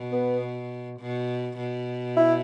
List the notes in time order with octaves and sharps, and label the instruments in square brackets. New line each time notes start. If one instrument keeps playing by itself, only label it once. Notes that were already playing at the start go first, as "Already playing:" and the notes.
Already playing: [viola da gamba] B2
[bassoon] B3
[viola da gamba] B2
B2
[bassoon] E4